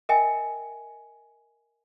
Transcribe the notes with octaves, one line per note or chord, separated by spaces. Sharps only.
A#4 D#5 E5 G5 G#5